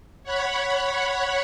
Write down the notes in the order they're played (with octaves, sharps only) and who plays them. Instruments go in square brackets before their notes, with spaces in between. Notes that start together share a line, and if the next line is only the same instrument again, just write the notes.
[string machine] C#5 F#5 B5